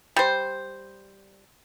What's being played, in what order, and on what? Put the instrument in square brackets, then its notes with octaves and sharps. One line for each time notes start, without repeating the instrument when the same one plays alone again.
[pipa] G3 C5